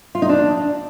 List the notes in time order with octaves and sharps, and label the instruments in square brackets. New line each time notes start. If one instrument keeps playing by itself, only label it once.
[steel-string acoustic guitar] F4
D#4
D4